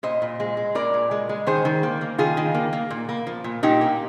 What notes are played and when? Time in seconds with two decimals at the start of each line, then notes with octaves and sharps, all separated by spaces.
0.03 A#2 C5 D#5
0.22 A#2
0.40 G#3
0.57 G#3
0.75 A#2 A#4 D5
0.94 A#2
1.11 G#3
1.29 G#3
1.47 D#3 G#4 C5
1.65 D#3
1.83 A#3
2.01 A#3
2.19 D#3 F4 G#4
2.37 D#3
2.55 A#3
2.73 A#3
2.91 A#2
3.09 A#3
3.27 F3
3.44 A#2
3.63 A#2 D#4 G4
3.81 A#3